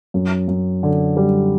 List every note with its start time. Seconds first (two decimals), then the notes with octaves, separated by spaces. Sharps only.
0.14 F#2
0.48 F#2
0.83 D3
1.17 G3